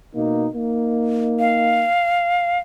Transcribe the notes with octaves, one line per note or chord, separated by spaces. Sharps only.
B2 A#3 D#4
A#3 D#4
F5